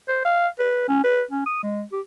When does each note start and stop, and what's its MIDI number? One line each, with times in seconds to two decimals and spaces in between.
0.09 0.22 72
0.25 0.48 77
0.59 0.84 71
0.89 1.01 61
1.04 1.23 71
1.31 1.45 61
1.46 1.60 87
1.63 1.83 56
1.93 2.01 67